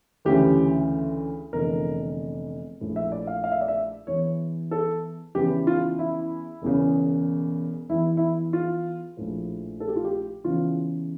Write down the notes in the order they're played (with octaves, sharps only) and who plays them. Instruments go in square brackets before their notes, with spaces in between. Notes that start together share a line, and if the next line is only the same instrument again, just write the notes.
[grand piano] D2 C#3 E3 G4
F1 E2 D3 A#4
A#1 A2 F3
E5
D5
F5
F5
E5
D5
E5
E2 E3 C#5
A4
E2 C#3 E3 G4
F4
E4
E1 E2 C#3
E2 E3 E4
E4
F4
A#1 A2 F3
A4
G4
F4
G4
E2 C#3 E3 F4